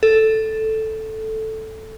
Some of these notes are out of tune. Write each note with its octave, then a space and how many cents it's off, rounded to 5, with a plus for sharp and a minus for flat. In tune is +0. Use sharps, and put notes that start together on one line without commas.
A4 +0